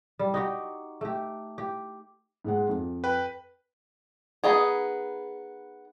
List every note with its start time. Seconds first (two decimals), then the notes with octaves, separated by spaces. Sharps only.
0.19 G3
0.34 D#4 F#4 G4
1.01 A3 G4
1.58 G4
2.45 G#2 G#3 F#5
2.68 F2
3.04 B4 G5 F#6
4.44 B3 D#4 G#4